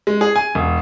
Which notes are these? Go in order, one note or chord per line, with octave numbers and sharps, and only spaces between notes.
G#3
G#4
G#5
E1